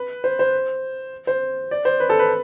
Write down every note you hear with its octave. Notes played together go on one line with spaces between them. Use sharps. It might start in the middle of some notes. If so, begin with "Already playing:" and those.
Already playing: B4
C5
C5
C5
D5
C5
B4
A4
B4